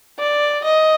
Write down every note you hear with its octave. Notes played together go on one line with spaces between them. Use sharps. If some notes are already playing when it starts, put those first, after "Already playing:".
D5
D#5